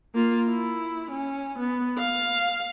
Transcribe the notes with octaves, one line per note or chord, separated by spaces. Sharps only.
A#3 F4
E4
C#4
B3
F5